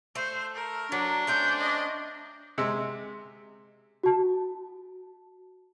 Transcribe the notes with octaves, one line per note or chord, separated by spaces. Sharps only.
A3 C5
A#4
F#3 D4
A3 C4 C#4 G6
D#5
C3 G#3 E6
F#4 A5